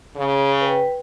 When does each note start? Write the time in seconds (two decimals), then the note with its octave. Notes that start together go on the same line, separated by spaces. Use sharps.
0.16 C#3
0.61 B4 G5